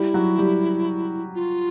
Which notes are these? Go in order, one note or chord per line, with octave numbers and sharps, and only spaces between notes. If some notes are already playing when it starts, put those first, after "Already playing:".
Already playing: G3 E4 G4
F#3 F#4
G3 G4
F4